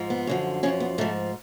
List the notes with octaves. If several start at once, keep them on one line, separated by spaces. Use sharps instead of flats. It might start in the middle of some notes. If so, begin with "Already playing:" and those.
Already playing: G#2 F3
B3
F#2 D3 F3
F#2 F3 C#4
B3
G#2 F3 A3